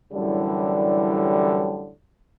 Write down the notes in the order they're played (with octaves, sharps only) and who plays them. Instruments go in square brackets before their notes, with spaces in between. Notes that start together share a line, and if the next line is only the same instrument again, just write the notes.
[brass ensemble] F#2 A2 D3 E3 G3